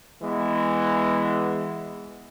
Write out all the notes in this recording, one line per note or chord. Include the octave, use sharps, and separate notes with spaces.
E3 G#3 B3